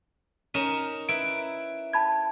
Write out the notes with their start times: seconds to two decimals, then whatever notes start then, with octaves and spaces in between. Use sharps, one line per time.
0.54 C#4 D#4 A#4 D#7 E7
1.09 E4 B4 D7
1.93 A5 B5 G#6